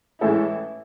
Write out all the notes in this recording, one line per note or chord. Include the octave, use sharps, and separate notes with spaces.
A2 E3 G#3 C#4 E4 A4